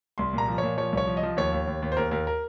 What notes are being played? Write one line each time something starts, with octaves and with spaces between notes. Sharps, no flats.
C2 C6
A#2 A#5
F3
A#2 C#5
F3 C#5
C2 C#5
F3
D#5
F3
D#2 C#5
D#2
D#2
D#2
C5
D#2 A#4
D#2 A#4
A#4